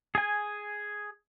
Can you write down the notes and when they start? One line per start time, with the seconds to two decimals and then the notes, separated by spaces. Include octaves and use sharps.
0.15 G#4 G#5